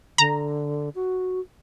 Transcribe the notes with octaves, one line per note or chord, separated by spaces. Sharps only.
D3 A#5
F#4